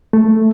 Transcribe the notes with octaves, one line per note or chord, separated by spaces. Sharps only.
A3